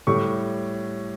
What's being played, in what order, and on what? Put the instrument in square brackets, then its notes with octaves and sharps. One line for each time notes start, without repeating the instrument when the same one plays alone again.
[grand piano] A2 G3 C#6